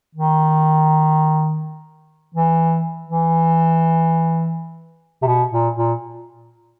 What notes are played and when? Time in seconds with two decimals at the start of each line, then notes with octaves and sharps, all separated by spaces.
0.15 D#3
2.34 E3
3.07 E3
5.22 C3
5.27 B2
5.52 A#2
5.75 A#2